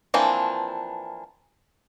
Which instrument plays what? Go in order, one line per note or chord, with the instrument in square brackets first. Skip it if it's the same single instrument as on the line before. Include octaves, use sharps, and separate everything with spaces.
[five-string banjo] E3 F3 A#3 C4 D4